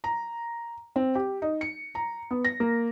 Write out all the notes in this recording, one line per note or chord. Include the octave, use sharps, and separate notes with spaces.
A#5
C4
G4
D#4
C#7
A#5
B3
A#6
A#3